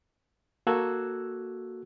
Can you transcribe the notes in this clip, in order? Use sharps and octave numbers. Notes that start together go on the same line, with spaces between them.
A#3 F#4 A4 E6 F#6 G#6